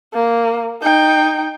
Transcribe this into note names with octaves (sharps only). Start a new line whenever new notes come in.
A#3
D#4 G5